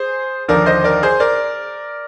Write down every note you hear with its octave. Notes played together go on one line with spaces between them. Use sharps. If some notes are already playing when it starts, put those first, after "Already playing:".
Already playing: G#4 C5
D#2 D3 F3 A#4 D5
C5 D#5
A#4 D5
G#4 C5
A#4 D5